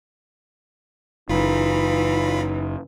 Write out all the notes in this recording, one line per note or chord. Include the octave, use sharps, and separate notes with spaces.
F#1 E3 D#4 F4 B5